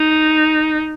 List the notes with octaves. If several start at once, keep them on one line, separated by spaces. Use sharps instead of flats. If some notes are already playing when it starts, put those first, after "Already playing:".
Already playing: D#4